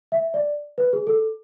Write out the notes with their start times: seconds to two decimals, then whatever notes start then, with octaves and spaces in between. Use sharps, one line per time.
0.12 E5
0.34 D5
0.78 B4
0.93 G#4
1.07 A4